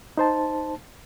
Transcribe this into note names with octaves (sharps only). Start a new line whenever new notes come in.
D#4 C5 A5